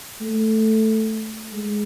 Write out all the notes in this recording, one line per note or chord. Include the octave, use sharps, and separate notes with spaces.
A3
G#3